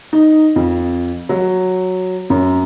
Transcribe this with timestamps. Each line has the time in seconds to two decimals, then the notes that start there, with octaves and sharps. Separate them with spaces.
0.13 D#4
0.56 F2
1.29 F#3
2.30 F#2